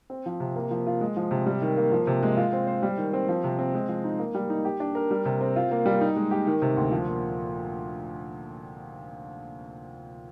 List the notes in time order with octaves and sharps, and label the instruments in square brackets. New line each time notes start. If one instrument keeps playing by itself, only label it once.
[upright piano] C4
F3
C3
A#3
F3
F4
G#3
F3
C3
G3
D#3
A#3
F3
C3
G#3
F4
C4
C5
G3
D#3
C4
F3
C3
C4
G#3
F3
D#4
A#3
G3
D#4
G4
D4
A#4
G3
C3
C4
F4
A#3
G3
D#4
G#3
G4
D#3
C3
D2
F3
A#2